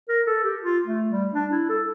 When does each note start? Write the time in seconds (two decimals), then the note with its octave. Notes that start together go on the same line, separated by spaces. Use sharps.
0.09 A#4
0.27 A4
0.44 G4
0.62 F4
0.86 A3
1.10 G3
1.34 D4
1.52 E4
1.69 A4